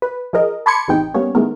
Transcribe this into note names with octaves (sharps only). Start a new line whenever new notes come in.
B4
F3 G#4 A#4 D#5
A5 B5 C6 D6 G#6 C#7
A1 E2 C3 E3 D#4 G5
G3 A#3 B3 C#4 C#5
D#3 E3 G#3 A3 B3 A#4